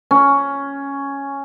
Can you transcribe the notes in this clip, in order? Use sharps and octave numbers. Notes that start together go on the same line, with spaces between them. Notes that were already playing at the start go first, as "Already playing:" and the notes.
C#4